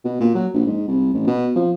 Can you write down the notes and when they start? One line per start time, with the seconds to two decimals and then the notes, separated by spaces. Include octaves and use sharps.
0.04 B2
0.20 A#2
0.35 F#3
0.54 A#1
0.67 G#2
0.88 C2
1.14 A1
1.27 B2
1.56 F3